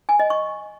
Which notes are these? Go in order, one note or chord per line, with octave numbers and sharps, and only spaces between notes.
G#5
D#5
C#6